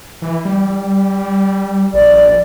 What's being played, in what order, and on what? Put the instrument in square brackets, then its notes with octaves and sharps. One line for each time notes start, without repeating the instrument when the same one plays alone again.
[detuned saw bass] E3
G3
[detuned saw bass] A#1 [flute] D5